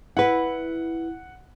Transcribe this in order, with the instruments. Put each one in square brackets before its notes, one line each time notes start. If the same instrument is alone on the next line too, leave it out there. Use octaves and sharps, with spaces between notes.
[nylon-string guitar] E4 B4 [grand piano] F#5